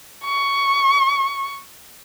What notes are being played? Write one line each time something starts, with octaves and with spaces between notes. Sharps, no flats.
C#6